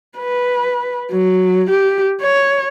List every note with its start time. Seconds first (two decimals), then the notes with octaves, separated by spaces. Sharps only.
0.18 B4
1.11 F#3
1.70 G4
2.21 C#5